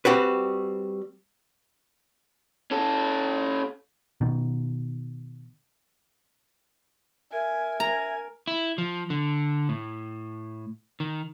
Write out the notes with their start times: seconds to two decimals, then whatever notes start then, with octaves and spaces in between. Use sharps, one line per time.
0.05 G3 C4 F#4 B4
2.71 C#4 A4
4.21 B2 D#3
7.32 A#4 E5 G#5
7.80 G#5 A#5
8.47 E4
8.78 F3
9.10 D3
9.69 A2
11.00 D#3